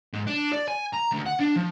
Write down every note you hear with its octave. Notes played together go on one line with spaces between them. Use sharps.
G#2
D4
D5
G#5
A#5
D2
F#5
D4
F3